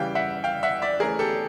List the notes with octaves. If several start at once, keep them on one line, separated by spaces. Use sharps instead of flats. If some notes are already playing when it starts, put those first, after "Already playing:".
Already playing: C#3 E3 G3 F5 G5
E5 F#5
F5 G5
E5 F#5
D5 E5
E3 A3 C#4 G#4 A#4
G4 A4